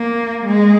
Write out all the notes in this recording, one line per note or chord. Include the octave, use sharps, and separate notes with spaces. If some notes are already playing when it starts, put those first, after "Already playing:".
Already playing: A#3
G#3